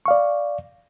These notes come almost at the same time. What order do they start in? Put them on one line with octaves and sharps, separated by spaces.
C#6 F5 D5